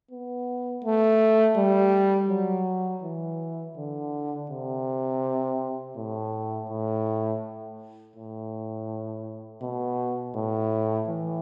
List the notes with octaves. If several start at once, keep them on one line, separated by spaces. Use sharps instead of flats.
B3
A3
G3
F#3
E3
D3
C3
A2
A2
A2
B2
A2
E3